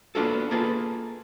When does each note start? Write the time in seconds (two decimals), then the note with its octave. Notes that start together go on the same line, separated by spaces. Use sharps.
0.15 A#3 B3 D4 F4 F#4 A4
0.51 A#3 F4 G#4 A4 B4